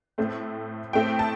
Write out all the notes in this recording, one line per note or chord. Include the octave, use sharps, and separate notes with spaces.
A2 A3 C4
A2 A3 C4 G5
A5